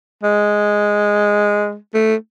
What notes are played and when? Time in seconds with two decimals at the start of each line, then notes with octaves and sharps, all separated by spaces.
0.23 G#3
1.94 A3